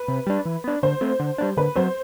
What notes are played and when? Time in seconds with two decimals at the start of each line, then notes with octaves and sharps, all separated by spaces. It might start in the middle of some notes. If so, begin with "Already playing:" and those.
Already playing: B4
0.08 C3
0.27 G3 D4
0.45 E3
0.64 B3 D4
0.83 D3 C5
1.01 A3 C4
1.19 D3
1.38 G3 B3 D4
1.57 D3 B4
1.75 F#3 C4 C5